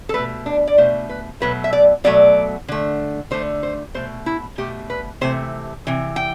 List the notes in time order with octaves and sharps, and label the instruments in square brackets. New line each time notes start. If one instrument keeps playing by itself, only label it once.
[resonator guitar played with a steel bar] A4
B2 A3 B4
D4
D5
B2 A3 C5
B4
B2 F#3 A3 B4
E5
D5
B2 F#3 A3 D5
D3 A3
D3 A3 C5
C5
B2 A3 C5
E4
B2 A3 G4
B4
C3 E3 A3 C5
C3 E3
G5